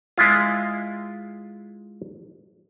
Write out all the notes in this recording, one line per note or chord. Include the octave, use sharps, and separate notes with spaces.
G#3 E4 F4